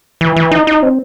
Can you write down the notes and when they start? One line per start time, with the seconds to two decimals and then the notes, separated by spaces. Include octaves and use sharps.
0.21 E3
0.36 E3
0.52 D#4
0.67 D#4
0.83 C4